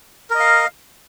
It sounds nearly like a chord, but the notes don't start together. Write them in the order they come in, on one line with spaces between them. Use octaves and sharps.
A#4 D#5 F5